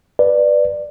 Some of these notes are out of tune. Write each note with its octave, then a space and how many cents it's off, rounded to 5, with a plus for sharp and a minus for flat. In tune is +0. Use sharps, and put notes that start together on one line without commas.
B4 +0 D5 +10